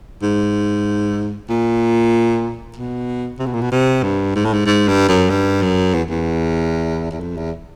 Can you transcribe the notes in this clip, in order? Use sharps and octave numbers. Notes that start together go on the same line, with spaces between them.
G#2
A#2
B2
C3
B2
A#2
B2
C3
G2
G#2
A2
G#2
G#2
G2
F#2
G2
F#2
E2
E2
E2
F2
E2